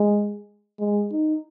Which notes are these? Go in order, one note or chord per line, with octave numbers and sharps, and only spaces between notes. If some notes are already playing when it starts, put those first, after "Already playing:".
Already playing: G#3
G#3
D#4